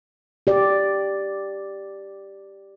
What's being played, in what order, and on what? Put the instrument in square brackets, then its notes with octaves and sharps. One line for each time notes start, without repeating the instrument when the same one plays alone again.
[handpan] G4 D5